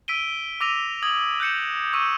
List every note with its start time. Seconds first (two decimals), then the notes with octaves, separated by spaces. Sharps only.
0.08 E6 B6 D7 D#7 G7
0.61 D6 E6 A#6 D#7 F7
1.03 D#6 G#6 F#7
1.40 F#6 G6 C#7 E7
1.93 C#6 E6 G6 D#7